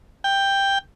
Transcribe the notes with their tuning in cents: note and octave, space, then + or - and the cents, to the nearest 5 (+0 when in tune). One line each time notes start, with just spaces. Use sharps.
G5 +10